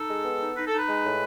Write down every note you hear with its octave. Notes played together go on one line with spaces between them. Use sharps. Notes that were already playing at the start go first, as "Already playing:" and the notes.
Already playing: D#4 A4
G#3
B3
D#4
D#4 B4
D#4 A4
B4
G#3
A2